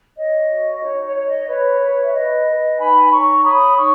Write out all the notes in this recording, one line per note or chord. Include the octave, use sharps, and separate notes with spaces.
C#5 D#5
F#4
D#4 C#5
C#5
C#5
D#5
B4 C#5
B4
E5
B4 D#5
B4
D#4 G#5 B5
C#5 A#5 C#6
E6
C#5 B5 D#6
D#4 C#6 E6